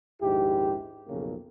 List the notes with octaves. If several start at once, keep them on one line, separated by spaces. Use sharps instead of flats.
A#1 D#2 G#2 E4 G4
B1 F2 C#3 F3 A#3 C#4